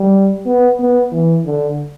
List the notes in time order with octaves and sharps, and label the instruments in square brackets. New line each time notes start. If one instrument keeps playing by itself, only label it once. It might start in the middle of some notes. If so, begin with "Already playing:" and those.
Already playing: [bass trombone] G3
B3
B3
E3
D3